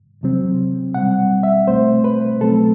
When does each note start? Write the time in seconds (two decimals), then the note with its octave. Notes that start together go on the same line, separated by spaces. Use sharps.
0.21 E2 C3 F#3 C4
0.94 B2 G3 C4 F#5
1.43 E5
1.68 C2 B2 A3 C4 C5
2.04 B4
2.41 B2 F#3 A3 C4 A4